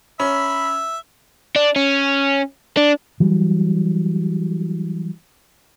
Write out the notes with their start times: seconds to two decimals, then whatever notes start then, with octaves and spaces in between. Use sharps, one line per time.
0.20 C#4 E5 B5
1.56 D4
1.76 C#4
2.77 D4
3.20 E3 F#3 G3